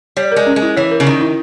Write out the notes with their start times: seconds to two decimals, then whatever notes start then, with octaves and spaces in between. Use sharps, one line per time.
0.17 G3 C#5
0.32 G#3 A#4
0.46 C#4
0.56 G#3
0.62 E4
0.77 E3 C#5
0.91 A#4
1.00 C#3
1.06 D#3 C#4
1.21 E4